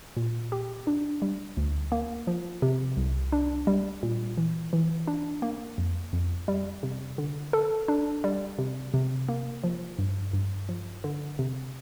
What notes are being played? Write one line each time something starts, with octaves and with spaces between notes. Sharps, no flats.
A#2
G4
D4
G3
D2
A#3
F3
C3
C2
D4
G3
A#2
E3
E3
D4
A#3
F2
F2
G3
C3
D3
A4
D4
G3
C3
C3
A#3
F3
G2
G2
F3
D3
C3